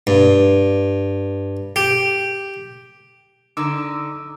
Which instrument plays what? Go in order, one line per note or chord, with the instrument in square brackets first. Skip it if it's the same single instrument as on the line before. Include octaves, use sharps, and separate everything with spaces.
[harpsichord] G2
G4
[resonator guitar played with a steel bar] D3 D#4 [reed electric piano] D6 E6